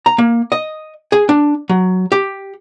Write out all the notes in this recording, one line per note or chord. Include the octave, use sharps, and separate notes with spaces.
A#5
A#3
D#5
G#4
D4
F#3
G4